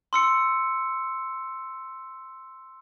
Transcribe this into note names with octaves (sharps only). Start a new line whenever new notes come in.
C6 E6 C#7